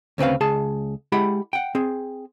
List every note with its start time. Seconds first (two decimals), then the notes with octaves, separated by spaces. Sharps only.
0.18 D2 C#3 C4 B4 F5
0.41 C#2 G#4 A5
1.12 G#3 E4 G4 F#5 B5
1.53 F#5 G5
1.75 C4 G#4